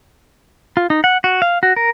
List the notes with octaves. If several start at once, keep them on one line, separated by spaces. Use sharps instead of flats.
F4
D#4
F#5
F#4
F5
F#4
A#4